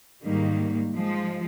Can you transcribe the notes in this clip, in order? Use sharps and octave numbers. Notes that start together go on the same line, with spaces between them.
G#2 D#3 G3 A#3
F3 G#3